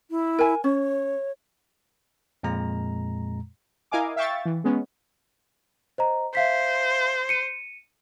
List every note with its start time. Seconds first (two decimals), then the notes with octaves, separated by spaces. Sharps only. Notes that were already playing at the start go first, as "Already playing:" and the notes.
0.11 E4
0.39 A#4 G#5
0.64 C#4 C#5
2.43 F2 A#2 G#3 A#5
3.91 E4 A#4 D#5 F5 G#5 D6
4.16 E5 F5 G5 C#6 A6
4.45 E3
4.64 G#3 B3 C#4
5.98 C5 D#5 A#5
6.35 C5 E5 F5 B6
7.29 C#7 D#7